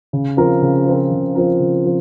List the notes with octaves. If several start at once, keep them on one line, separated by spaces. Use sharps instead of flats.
C#3
F3 C4 F4 A#4
C#3
F3 C4 F4 A#4
C#3
F3 C4 F4 A#4
C#3
F3 C4 F4